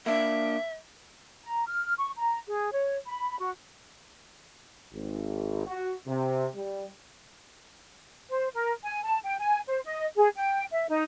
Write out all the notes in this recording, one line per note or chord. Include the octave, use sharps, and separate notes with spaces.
A#3 D4 E5
A#5
F6
C#6
A#5
G#4
C#5
B5
F#4
G#1
F#4
C3
G3
C5
A#4
G#5
A5
G5
G#5
C5
D#5
G#4
G5
E5
D#4